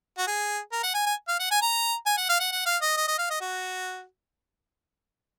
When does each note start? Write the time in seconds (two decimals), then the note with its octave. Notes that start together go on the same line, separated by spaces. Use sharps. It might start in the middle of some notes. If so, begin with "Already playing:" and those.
0.18 F#4
0.27 G#4
0.72 A#4
0.83 F#5
0.94 G#5
1.06 G#5
1.28 F5
1.39 F#5
1.51 G#5
1.62 A#5
2.06 G#5
2.17 F#5
2.29 F5
2.40 F#5
2.52 F#5
2.66 F5
2.82 D#5
2.97 D#5
3.08 D#5
3.18 F5
3.30 D#5
3.41 F#4